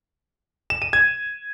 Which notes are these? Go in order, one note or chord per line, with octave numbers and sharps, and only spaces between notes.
E7
D#7
G#6